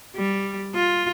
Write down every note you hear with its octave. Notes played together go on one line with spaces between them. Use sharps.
G3
F4